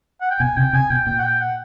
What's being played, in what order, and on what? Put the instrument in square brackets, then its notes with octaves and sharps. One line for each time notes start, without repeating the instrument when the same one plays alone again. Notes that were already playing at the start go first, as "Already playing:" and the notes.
[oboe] F#5
G5
[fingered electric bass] B2 [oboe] G#5
[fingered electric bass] C3 [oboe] G5
[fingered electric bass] C3 [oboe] G#5
[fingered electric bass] B2 [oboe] G5
[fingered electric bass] A#2 [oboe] G5
[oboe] F#5
G5
F#5